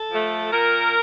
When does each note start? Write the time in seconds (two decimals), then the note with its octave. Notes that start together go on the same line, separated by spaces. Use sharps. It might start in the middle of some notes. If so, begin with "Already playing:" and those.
Already playing: A4
0.12 F3 A3
0.52 A#2 A#4